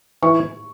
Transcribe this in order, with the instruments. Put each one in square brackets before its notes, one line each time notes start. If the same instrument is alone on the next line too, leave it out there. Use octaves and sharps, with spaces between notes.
[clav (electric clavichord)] E3 [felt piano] C#6